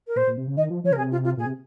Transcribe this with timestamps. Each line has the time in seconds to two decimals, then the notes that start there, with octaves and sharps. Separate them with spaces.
0.07 A#4
0.16 A#2 C5
0.27 A#2
0.37 C3
0.47 C#3
0.57 D#3 D#5
0.70 F3
0.84 F3 C#5
0.91 C#3 A#4
0.97 C3 G#4
1.11 F4
1.24 F4
1.37 A#2 G#4
1.46 C3